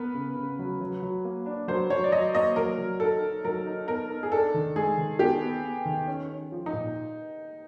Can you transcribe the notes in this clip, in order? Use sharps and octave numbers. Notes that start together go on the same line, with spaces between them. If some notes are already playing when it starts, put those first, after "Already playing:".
Already playing: B3 A#4 B4
C#3
C#3
F#3
F#3
F#3
A#3
D4
F#3 C5
F#3 C#5
D5
F#3 D#5
A#3 D#5
F#3 A#4
F#3
D#4 A4
D#4
F#3 A#4
D#4
B3 A#4
D#4
G#4
D4 A4
D#3
G#3 G#4
D#3
B3 G4
B3
B3
D#3
C#4
C#4
F3
D#4
A#2